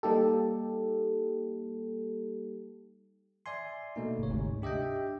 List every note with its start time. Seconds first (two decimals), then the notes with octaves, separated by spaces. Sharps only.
0.03 G3 A#3 D#4 G4 A4
3.46 D5 E5 G#5 C6
3.96 B2 A3 A#3 D#4
4.19 G1 C#5
4.30 D2 G#2 C3
4.62 D4 G4 D#5 E5 G5